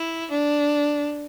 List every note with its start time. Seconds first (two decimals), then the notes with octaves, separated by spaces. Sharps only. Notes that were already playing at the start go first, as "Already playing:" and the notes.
Already playing: E4
0.30 D4